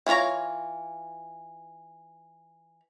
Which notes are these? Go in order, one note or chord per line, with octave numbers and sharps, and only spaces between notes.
E3 C#4 F4 C#5 A#5